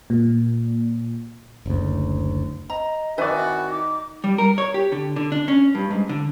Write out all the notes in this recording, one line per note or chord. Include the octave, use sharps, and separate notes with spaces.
A#2
F#1 D2
D#5 A#5
D#3 C4 E4 F#4 B4 D5 E5 G#5
D#4 D6
G3
A#4
C#5
G4
D3
D3
D4
C#4
G2
G#2
D3